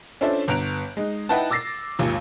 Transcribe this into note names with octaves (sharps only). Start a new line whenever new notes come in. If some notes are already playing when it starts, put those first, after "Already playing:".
C#4 D4 F4 A4 C5 E5
G1 B3 A#5 F#6 D7 F7
G#3 D#4
D#4 E4 B4 F#5 G5 A5
D6 E6 A6 A#6 C7
G#1 D#2 A#2